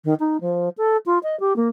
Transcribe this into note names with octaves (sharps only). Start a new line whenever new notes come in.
D#3
D#4
F3
A4
F4
D#5
G4
A#3